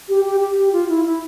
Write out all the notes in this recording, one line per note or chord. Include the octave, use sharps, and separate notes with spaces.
G4
G4
G4
F4
E4
E4